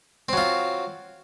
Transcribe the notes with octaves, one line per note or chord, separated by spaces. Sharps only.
F#3 C4 F4